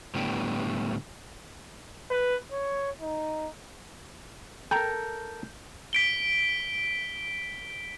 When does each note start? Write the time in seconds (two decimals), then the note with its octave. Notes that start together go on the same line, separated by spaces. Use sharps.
0.15 A2 D3 G3 B3 G5
2.10 B4
2.52 C#5
3.01 D#4
4.71 A4 A#4 G5 A#5 G6
5.93 B6 D7 G7